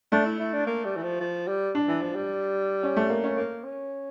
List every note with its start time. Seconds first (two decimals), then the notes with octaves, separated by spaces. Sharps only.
0.12 A3 D4
0.26 E4
0.40 E4
0.53 D4
0.67 A#3
0.85 G3
0.96 E3
1.03 F3
1.20 F3
1.48 G3
1.75 D4
1.88 E3
2.01 F3
2.15 G3
2.83 C#4
2.96 A3
3.10 A#3
3.24 C#4
3.37 A#3
3.64 C#4